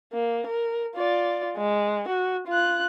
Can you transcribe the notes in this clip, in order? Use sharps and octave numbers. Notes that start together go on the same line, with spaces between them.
A#3
A#4
F4 D5
G#3
F#4
F4 F#6